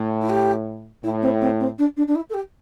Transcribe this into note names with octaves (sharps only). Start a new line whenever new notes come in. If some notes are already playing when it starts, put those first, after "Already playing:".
Already playing: A2
E4
G4
A2 E4
C4
C4
C4
D4
D4
D4
E4
A4
G4